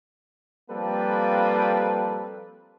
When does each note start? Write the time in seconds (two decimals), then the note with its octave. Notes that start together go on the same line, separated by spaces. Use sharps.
0.70 F3 G3 A#3 C4 A4 B4